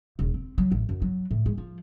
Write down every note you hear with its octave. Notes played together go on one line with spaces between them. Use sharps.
E1
C4
F#3
A1
F#2
F#3
A2
G#3
F3